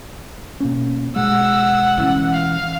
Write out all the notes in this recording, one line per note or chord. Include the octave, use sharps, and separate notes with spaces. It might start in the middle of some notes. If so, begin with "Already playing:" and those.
B2 A#3 C#4
B2 G#3 F#5 E6
E3 C#4
F5